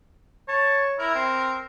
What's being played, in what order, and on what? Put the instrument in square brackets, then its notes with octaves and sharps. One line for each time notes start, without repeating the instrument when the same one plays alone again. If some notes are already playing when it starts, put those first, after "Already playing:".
[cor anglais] C#5 [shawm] A5
[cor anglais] E4 [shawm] A#4
[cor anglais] C4